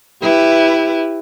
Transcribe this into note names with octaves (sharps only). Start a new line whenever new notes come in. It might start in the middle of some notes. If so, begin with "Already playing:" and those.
E4 G4 B4